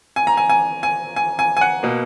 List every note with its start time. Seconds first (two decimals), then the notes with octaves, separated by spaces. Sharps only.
0.16 G#5
0.27 A#5
0.37 G#5
0.50 G#5
0.83 G#5
1.16 G#5
1.39 G#5
1.57 G#5
1.61 F#5
1.83 B2 A#3